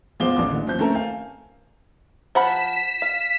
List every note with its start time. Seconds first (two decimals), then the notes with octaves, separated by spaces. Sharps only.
0.20 E2 G#3 F4 C5 D6 G7
0.37 A1 A#3 D6
0.51 D3 A3
0.67 D#2 F3 C4 G6
0.79 A3 C4 C#4 A4 A#4 A5
0.95 F5 G#5
2.35 F3 F#5 B5 B6 E7
3.02 F5